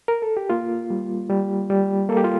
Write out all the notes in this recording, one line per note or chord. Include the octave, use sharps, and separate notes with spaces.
A#4
A4
G4
A#3 F4
G3
G3
G3
A#3 A4
G4
F4